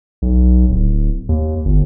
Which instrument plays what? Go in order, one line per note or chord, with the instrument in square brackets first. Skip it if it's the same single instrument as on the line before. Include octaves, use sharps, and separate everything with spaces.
[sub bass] B1
D1
D#2
G1